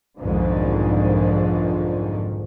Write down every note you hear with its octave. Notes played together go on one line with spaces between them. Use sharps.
B1 F2 G#2 D3 D#3 F3